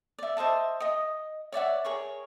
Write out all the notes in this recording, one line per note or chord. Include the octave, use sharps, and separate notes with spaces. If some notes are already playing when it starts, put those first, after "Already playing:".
D5 E5
C5 D#5 E5 A5
D#5 D#6
C#5 D5 E5 F#5
G#4 A#4 C#5 C#6